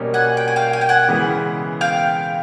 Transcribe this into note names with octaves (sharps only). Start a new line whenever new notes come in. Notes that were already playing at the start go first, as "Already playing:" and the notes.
Already playing: B2 G3 A#3 C#4
F#5 G#5
G5
G#5
F5 G5
G#5
G5
F#5 G#5
C#3 E3 G#3 B3
F5 G5